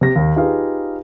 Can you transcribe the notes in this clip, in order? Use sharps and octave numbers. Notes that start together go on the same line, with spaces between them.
C3 A#6
D#2
D#4 F4 G4 G#4 B4 F5